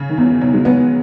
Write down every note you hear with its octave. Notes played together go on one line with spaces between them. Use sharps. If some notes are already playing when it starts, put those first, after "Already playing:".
Already playing: C#3
D#3
E2 F#3
E3
B2 F#3
G#3
F#3 B3